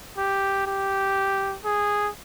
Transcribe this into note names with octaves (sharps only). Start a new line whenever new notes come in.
G4
G4
G#4